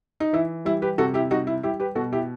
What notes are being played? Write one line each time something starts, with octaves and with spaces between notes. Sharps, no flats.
D#4
E3 E4
G3 E4
G4 B4
C3 F#4 A4
E4 G4
G3 D#4 F#4
E4
G3 E4 G4
G4 B4
B2 F#4 A4
E4 G4